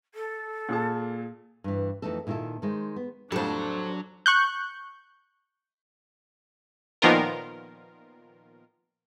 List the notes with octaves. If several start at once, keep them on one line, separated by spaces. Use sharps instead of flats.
A4
A#2 G#4 A5
G2 E3
F2 E3 A3 D#4 A4
A#2 D#3 E4 F4 A4
D#3 G#3 C5
B3
F2 A2 F#3 G3 D4 A4 C5
C#6 F#6 G6
A#2 D#3 F3 B3 F4 A#4